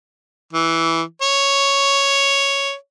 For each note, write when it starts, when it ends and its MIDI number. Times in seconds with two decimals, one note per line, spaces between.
0.53 1.02 52
1.22 2.74 73